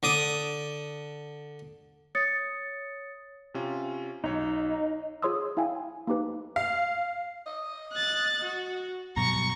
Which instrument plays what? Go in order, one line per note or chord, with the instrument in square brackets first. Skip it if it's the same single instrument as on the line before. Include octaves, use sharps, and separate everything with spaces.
[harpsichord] D3 D5 D#6
[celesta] C#5 D#6 A6 C#7
[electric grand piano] C3 C#4 F4
[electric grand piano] B1 C#5 [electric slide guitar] D#4
[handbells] F4 G#4 C#5 C6 D#6 E6
E4 F5 G5 G#5
A#3 D#4 G4 B4
[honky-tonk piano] F5
[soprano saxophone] D#5
[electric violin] F#6 A6
F#4
[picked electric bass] G2 B2 F#3 [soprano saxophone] A#5 [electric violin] C#6 C#7